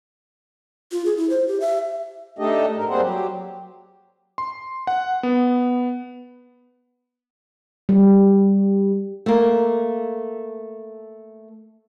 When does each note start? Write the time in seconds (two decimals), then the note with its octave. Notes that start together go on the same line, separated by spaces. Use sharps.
0.92 F4
1.05 G#4
1.17 E4
1.30 C5
1.48 G4
1.61 E5
2.39 A3 D4 D#4 G4 A4 D#5
2.76 G#2 A#4
2.89 G3 A#3 C4 G#4 C5 F#5
3.02 F#3 G4
4.38 C6
4.87 F#5
5.23 B3
7.89 G3
9.26 A3 A#3